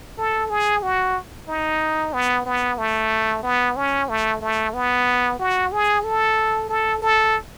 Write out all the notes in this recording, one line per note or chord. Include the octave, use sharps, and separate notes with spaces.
A4
G#4
F#4
D#4
B3
B3
A3
B3
C#4
A3
A3
B3
F#4
G#4
A4
A4
A4